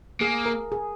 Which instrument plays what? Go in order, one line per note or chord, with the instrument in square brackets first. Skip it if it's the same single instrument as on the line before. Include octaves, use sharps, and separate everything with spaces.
[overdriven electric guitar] A#3 [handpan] G#4
[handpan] A#4
G#4